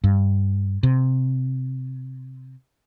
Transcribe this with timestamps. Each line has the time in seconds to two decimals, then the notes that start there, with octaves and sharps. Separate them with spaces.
0.04 G2
0.83 C3